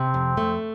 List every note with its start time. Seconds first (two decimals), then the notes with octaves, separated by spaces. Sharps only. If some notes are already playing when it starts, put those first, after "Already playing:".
Already playing: C3 C4
0.14 F2
0.37 A3